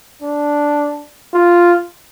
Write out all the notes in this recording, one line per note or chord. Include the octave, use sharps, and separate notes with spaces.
D4
F4